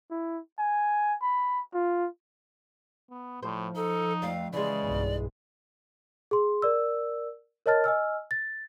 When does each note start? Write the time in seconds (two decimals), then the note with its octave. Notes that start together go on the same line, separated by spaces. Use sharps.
0.11 E4
0.59 G#5
1.22 B5
1.74 F4
3.10 B3
3.43 A2 F3 C5
3.76 D#4 A4
4.22 F2 A3 F5
4.53 C#3 E3 G#3 D5
4.82 B1 E2 G2
6.31 G#4 C6
6.62 A#4 D5 E6
7.66 A#4 C#5 D#5 A5 F6 A6
7.84 D#5 G#5 E6 F6
8.31 A6